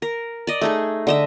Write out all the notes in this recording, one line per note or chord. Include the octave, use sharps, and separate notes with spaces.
A#4
D5 D#5
A3 D#4 G#4
D3 D#5 E5